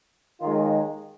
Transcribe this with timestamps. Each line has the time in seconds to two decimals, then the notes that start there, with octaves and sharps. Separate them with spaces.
0.40 D#2 D#3 G#3 F4